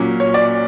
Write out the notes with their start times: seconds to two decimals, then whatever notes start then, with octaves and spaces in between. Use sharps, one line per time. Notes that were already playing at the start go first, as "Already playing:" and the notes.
Already playing: A#2 F#3 C#4
0.20 C#5
0.34 D5